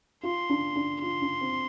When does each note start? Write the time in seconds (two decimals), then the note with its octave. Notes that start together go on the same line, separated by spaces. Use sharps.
0.23 F4 C6
0.50 D4
0.76 D4
1.02 F4 C6
1.22 D4
1.41 C4